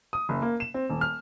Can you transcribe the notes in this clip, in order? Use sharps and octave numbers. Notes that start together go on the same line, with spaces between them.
D#6
F#1
A#3
E7
C4
D#1
F6